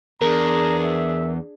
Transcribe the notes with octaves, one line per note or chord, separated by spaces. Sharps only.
E2 D4 G#4 A#4 A#5
E5